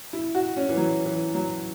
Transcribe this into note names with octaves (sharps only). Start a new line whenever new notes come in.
E4
F#4
C#4
E3
F#3
E3
F#3